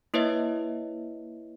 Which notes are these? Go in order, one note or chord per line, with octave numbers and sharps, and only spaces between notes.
A#3 E4 B4 C#5 D#5 E5